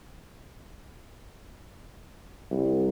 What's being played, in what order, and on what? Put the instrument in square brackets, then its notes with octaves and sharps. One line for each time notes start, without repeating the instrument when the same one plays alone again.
[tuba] C2